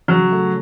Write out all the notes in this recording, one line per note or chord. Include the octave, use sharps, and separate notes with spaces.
C#3 F#3
A3